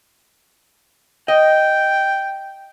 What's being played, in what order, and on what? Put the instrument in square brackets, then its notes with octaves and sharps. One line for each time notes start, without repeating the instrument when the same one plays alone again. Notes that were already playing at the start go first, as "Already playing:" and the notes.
[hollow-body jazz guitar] D#5 [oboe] G5